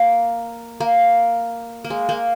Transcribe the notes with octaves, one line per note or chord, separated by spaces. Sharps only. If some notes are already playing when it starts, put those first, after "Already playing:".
Already playing: A#3
A#3
A#3
G#3
A#3